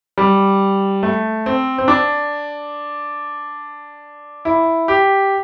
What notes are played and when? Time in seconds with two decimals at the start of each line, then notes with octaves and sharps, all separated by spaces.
0.18 G3
1.03 A3
1.46 C4
1.78 C4
1.88 D4
4.45 E4
4.88 G4